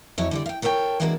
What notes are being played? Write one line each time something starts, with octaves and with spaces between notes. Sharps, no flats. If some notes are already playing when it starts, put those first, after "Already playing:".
F2 F#3 E4 C#5
D3 G3 D5
F5 G5
A4 A#4 C#5 D#5 G5
E3 G#3 A#3 D4 F#4 F#5